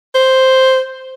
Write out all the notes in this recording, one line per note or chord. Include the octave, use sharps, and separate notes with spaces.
C5